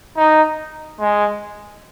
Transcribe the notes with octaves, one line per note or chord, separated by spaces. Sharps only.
D#4
G#3